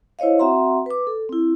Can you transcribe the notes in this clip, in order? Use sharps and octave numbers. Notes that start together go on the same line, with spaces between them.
E4 C5 C#5 D#5 F5
C4 F#4 E5 F#5 A#5 C6
B4 D6
A4
C4 E4